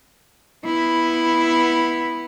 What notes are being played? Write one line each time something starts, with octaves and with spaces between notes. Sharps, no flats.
B3 E4